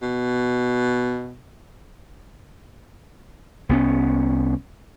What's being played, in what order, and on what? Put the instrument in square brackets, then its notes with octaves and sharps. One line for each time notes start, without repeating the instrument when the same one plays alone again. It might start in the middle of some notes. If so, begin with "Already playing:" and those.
[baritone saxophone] B2
[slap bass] C2 B3 C#4